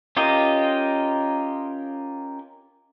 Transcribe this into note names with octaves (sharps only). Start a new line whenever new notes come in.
C#4 F4 G4 A#4 D#5